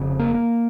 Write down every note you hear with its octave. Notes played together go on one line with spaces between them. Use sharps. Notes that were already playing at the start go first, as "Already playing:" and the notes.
Already playing: F1 F2 C#3
A#3
A#3